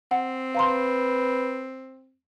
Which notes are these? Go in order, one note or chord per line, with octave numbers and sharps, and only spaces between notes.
C4 F#5
B4 F5 A#5 C6